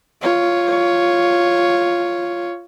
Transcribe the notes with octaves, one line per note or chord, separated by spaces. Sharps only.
F4 C#5